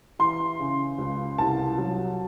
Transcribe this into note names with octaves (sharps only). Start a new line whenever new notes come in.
E3 C6
C#3
C#2
C2 A5
F#3